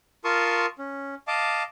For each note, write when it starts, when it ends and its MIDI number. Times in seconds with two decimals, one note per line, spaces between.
0.24 0.66 65
0.24 0.66 70
0.24 0.66 81
0.24 0.66 84
0.24 0.66 85
0.24 0.66 87
0.79 1.15 61
1.28 1.63 75
1.28 1.63 77
1.28 1.63 81
1.28 1.63 86